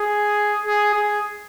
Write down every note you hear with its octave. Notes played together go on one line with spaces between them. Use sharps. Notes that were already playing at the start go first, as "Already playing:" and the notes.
Already playing: G#4
G#4
G#4